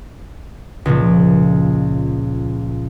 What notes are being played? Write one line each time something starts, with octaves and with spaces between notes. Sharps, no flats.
C#2 A#2 F3